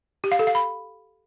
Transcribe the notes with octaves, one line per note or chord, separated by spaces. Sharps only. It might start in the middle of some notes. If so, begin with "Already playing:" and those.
G4
F5
A4
F5
B5